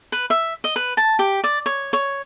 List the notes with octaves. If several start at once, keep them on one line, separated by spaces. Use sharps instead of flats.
B4
E5
D#5
B4
A5
G4
D5
C#5
C#5